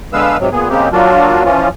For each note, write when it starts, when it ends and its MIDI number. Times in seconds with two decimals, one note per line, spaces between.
0.13 0.37 50
0.13 0.37 56
0.13 0.37 59
0.13 0.37 71
0.13 0.37 77
0.13 0.37 88
0.40 0.49 44
0.40 0.49 48
0.40 0.49 54
0.52 0.68 46
0.52 0.68 59
0.52 0.68 68
0.69 0.89 49
0.69 0.89 56
0.69 0.89 58
0.69 0.89 60
0.69 0.89 67
0.92 1.43 54
0.92 1.43 58
0.92 1.43 62
0.92 1.43 65
0.92 1.43 66
1.45 1.68 52
1.45 1.68 53
1.45 1.68 61
1.45 1.68 65